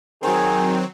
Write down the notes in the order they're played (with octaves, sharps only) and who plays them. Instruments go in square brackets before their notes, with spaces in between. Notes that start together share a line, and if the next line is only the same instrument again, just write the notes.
[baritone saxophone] D#3 [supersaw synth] F#3 C4 [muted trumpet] G#4